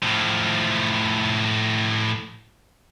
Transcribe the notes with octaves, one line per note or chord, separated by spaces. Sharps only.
A2 F3